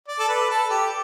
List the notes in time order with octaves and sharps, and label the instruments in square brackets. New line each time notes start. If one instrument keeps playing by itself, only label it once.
[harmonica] D5
A4
B4
A4
G4